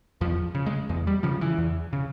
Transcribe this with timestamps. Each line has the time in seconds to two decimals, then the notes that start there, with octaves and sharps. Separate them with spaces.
0.21 E2 F3
0.55 C#3
0.66 G#3
0.89 E2 G#3
1.07 G3
1.23 C#3 F3
1.41 E3
1.58 E2
1.93 C#3